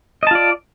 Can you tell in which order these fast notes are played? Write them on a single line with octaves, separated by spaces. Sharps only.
D#5 A5 F4 D5